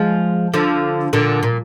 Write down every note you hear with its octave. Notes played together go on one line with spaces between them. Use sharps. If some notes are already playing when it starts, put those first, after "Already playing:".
Already playing: F3 G#3
D3 F3
A#2 D3
A#2